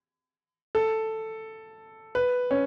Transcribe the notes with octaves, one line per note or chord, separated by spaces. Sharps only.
A4
B4
C#4